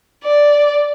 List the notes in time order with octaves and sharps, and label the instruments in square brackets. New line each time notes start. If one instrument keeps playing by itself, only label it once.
[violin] D5